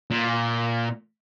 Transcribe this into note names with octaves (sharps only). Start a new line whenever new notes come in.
A#2